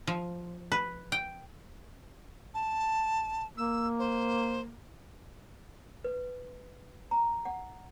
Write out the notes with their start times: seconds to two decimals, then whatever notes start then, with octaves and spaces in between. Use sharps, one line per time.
0.07 F3
0.72 B4
1.12 G5
2.54 A5
3.57 A#3 E6
3.99 C5
6.04 B4
7.11 A#5
7.45 F#5